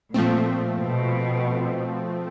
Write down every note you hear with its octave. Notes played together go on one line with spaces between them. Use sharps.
A#2 F3 A3 C4
B2